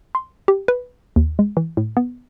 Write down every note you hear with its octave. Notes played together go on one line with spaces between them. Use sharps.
C6
G4
B4
D#2
G#3
E3
A2
B3